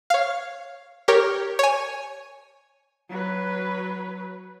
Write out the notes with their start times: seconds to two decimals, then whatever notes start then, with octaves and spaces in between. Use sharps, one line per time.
0.10 C#5 F5
1.08 G4 A#4 C#5
1.59 C#5 G#5
3.10 F#3 B4